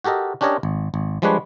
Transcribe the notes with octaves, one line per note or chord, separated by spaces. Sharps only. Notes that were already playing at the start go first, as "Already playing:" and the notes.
F#4 G4 A4 A#4 D#5
C#4 D4 G4 A#4 C#5 D#5
G#1
G#1
F3 G3 G#3 D4 B4 C#5